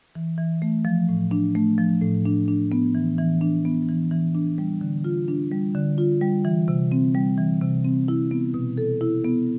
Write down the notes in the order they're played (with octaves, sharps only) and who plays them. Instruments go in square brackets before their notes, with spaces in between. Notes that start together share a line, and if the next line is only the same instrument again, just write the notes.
[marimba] E3
E3
A3
F3
A2
D4
A3
F3
A2
D4
D4
B3
E3
E3
D4
B3
E3
E3
D4
G3
D3
F4
D4
G3
D3
F4
G3
E3
C3
C4
G3
E3
C3
C4
E4
B3
B2
A4
E4
B3